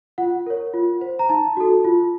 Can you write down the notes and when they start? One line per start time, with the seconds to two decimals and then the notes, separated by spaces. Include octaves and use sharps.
0.18 F4 F#5
0.46 A#4 C#5
0.74 F4
1.01 C5
1.19 A#5
1.29 D#4 A5
1.57 F#4 A4
1.85 F4